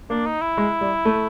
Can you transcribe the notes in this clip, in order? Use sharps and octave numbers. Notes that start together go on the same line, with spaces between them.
A#3 D4
D#4
E4
G#3
G3
A3